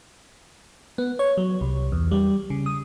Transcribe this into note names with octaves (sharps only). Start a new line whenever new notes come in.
B3
C#5
F#3
C2
E2
G3
C#3
D#6